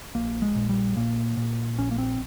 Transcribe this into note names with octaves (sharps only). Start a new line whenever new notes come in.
A#1 A#3
G#3
A#2
G3
A#2 A#3
A#2
A#1 C#4
A#3
C4